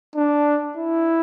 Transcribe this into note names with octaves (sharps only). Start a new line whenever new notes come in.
D4
E4